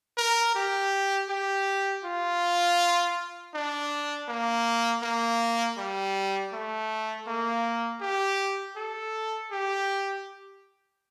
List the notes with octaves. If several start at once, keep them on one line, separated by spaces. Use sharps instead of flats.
A#4
G4
G4
F4
D4
A#3
A#3
G3
A3
A#3
G4
A4
G4